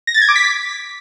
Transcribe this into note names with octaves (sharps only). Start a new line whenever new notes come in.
A#6
A6
G#6
D6
B6